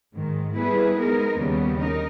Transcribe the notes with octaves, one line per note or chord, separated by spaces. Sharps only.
G#2 D#3 G#3
G3 B3 E4 G#4 B4
G#3 B3 D#4 A#4
D#2 C#3 G3 B3
D#4 A#4